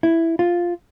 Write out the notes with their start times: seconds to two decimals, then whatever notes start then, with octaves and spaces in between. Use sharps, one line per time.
0.03 E4
0.39 F4